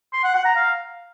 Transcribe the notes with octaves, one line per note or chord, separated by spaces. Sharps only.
C6
F#5
F#5
A#5
F5